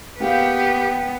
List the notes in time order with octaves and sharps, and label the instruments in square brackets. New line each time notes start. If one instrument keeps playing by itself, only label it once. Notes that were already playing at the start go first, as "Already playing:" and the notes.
[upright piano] A#3 G#4 F5 [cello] B3 [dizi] G4 [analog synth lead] G5